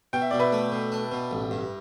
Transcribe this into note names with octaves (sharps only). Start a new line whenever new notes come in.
B2 G5
E5
B2 D5
B4 E5
A3
B2
D4
B2
A1
G2